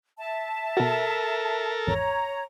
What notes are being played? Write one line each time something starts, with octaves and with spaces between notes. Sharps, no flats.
E5 A5
B2 F#4 A4 A#4
G#1 E2 C#5 A#5